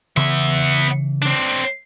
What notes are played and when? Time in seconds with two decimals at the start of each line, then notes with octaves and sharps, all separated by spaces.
0.17 C#3 E3 B3 E5 C6
1.22 C4 D4